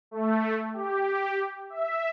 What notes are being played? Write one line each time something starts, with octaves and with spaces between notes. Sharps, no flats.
A3
G4
E5